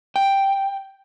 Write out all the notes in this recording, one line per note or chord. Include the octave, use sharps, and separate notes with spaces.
G5